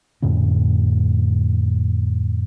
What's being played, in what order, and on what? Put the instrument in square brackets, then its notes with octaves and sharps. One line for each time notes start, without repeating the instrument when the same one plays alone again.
[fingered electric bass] F2 A2 D3 C#4